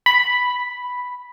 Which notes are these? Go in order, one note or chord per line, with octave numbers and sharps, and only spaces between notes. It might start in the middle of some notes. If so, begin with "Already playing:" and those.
B5